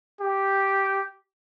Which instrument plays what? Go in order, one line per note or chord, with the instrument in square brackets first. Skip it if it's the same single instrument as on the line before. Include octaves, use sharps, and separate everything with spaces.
[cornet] G4